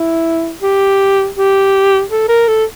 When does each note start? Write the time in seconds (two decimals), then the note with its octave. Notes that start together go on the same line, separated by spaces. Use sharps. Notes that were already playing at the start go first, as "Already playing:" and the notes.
Already playing: E4
0.61 G4
1.36 G4
2.10 A4
2.28 A#4
2.48 A4